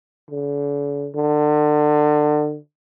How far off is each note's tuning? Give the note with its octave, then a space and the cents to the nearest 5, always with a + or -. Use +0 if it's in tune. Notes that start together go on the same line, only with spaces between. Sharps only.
D3 -45
D3 +30